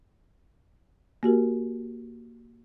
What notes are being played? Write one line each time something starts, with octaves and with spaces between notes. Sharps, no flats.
A#3 F#4 G4 A#4